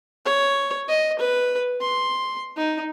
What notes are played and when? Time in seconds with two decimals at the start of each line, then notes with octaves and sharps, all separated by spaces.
0.25 C#5
0.88 D#5
1.19 B4
1.81 C6
2.56 D#4